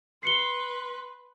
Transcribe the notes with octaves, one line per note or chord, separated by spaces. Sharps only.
B4 C6 C7 C#7 G7